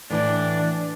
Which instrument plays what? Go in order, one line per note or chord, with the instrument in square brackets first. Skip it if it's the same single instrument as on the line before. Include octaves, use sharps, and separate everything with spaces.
[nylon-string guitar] A2 E3 [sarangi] D4